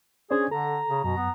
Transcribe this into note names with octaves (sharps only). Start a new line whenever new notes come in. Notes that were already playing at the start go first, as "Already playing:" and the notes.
C#4 D4 G#4 C5 D5
D3 A4 A#5
C#3
F#2 B2 A#5
B3